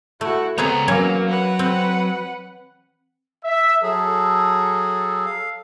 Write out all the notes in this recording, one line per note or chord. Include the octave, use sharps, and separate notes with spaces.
A3 E4 F#4
C#2 B3 C4 G#4 C#5 A#5
E3 F#3 A#3 C#4 F#4 C#5
B4 F#5
C4
E5
F#3 G#4 A4
F5